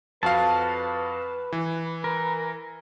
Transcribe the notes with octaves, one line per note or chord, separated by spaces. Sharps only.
F2 F#4 B4 F5 A5
E3
A#4